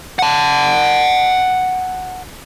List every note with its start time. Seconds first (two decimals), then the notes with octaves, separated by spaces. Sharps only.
0.19 F#5 A5